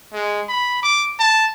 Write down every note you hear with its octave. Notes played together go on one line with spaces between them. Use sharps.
G#3
B5
D6
A5